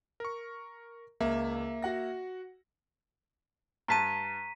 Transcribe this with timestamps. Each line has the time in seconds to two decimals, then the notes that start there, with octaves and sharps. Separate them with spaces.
0.20 A#4 C#6
1.21 C#2 A#3 E5
1.82 F#4 F#5 A#6
3.88 G2 A5 A#5 B6 D#7